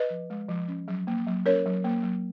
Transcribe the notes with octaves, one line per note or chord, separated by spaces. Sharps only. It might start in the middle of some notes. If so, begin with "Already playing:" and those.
Already playing: B4 D#5
F3
G#3
F3
C#4
F#3
A#3
F#3
C#4 A#4 C#5
F#3
A#3
F#3